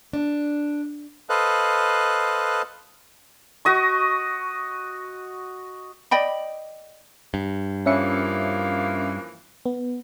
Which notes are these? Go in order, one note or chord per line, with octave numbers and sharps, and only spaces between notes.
D4
A4 B4 C5 D#5 F5 F#6
F#4 D#5 C#6
D5 D#5 G5 B5
G2
E3 F3 A#3 C#4 E5 C#7
B3